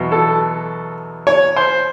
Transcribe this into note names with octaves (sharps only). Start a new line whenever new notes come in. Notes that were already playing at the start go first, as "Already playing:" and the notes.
Already playing: E2 B2 F#3
A4
C#5
C5